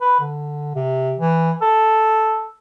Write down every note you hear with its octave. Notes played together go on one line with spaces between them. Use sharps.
B4
D3
C3
E3
A4